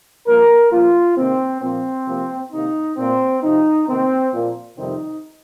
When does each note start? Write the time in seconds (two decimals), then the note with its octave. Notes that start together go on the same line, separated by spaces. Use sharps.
0.26 G2 F3 A#3 A#4
0.71 G2 F3 A#3 F4
1.17 C3 D#3 A#3 C4
1.61 A#2 F3 A#3 C4
2.06 C3 F3 A#3
2.52 C3 D#3 A#3 D#4
2.97 A#2 A#3 C4
3.42 C3 F3 C4 D#4
3.87 C3 D#3 A#3 C4
4.32 A#2 F3 A#3
4.78 F2 C3 D#3 G3 C4 D#4